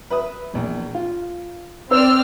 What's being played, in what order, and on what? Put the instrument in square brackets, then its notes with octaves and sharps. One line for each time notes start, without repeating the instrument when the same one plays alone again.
[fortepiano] B4 E5 D#6
A#1 E2
F4
[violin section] C4 D5 F6 [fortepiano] C5 [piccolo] E6